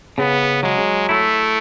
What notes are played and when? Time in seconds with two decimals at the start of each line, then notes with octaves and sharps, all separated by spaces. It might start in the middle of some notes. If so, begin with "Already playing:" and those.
0.18 C#3 B3
0.63 F#3 G#3
1.09 A3 E4